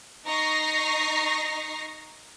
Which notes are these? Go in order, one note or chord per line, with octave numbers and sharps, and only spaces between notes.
D#4 A#5 C#6 A#6 C7